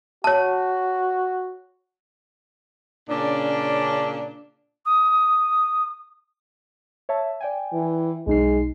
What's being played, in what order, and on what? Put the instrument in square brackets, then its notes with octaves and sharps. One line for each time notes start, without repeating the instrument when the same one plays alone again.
[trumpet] F#4 [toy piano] C#5 A5
[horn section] A#2 C#3 C#4 D4
[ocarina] D#6
[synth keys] C#5 E5 A5
D5 G5 G#5
[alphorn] E3
[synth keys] B1 D#4 C7 [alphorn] G#3